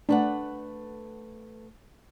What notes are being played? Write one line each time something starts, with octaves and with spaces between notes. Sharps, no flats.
A3 D4 B4 F#5